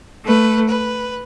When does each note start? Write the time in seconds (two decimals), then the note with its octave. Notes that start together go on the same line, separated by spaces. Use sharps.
0.23 A3 B4
0.69 B4